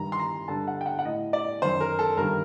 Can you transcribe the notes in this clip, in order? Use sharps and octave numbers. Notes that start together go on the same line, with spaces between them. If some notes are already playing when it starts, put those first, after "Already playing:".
Already playing: G2 D#3 A#5
C6
A#5
G2 D3 A5
F#5
G5
F#5
F#5
A2 D#5
D5
F#2 D#3 C5
A#4
A4
G2 D#3 A#4